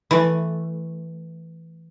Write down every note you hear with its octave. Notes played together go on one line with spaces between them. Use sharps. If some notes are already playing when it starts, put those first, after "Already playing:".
E3 A3